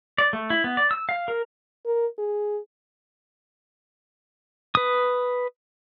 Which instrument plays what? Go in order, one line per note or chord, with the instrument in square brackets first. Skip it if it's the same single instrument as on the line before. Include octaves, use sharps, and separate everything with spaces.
[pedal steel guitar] D5
A3
E4
B3
D5
E6
F5
A#4
[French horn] A#4
G#4
[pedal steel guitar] B4 D#6